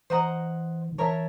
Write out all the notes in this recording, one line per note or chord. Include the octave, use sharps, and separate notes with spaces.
E3 C5 D#5 F#5 A#5
D#3
E3 A#4 C#5 E5 A5